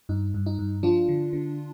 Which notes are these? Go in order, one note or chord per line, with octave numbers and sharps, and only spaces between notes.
G2 D#4
G2
D#4
G2
F3 D4 F4
D3
D3